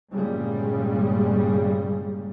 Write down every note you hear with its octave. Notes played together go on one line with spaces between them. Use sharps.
G1 G2 A#2 C#3 G3 G#3